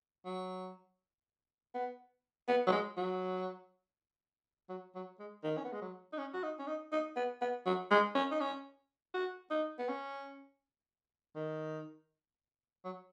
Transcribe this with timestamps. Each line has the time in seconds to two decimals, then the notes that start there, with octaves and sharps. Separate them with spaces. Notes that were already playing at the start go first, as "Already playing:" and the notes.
0.26 F#3
1.74 B3
2.48 B3
2.67 F#3
2.72 G#3
2.97 F#3
4.69 F#3
4.95 F#3
5.19 G#3
5.44 D#3
5.57 C#4
5.64 B3
5.72 G#3
5.81 F#3
6.13 D#4
6.18 C#4
6.34 F#4
6.43 D#4
6.59 C#4
6.67 D#4
6.92 D#4
7.16 B3
7.41 B3
7.66 F#3
7.91 G#3
8.15 C#4
8.31 D#4
8.40 C#4
9.14 F#4
9.51 D#4
9.79 B3
9.89 C#4
11.35 D#3
12.85 F#3